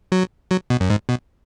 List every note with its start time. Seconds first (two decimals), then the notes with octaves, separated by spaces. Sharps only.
0.12 F#3
0.51 F#3
0.70 B2
0.80 F#2
0.90 G#2
1.09 B2